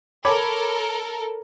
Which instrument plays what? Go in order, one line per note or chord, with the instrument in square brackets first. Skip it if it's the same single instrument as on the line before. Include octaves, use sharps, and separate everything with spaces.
[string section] A4 A#4 [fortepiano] C#5 B5 D6